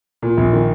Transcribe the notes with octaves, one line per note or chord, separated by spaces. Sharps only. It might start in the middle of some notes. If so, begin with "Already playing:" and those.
A#2
A#1
D#3